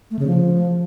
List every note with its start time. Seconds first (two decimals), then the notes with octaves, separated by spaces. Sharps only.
0.11 A3
0.19 C#3
0.27 F3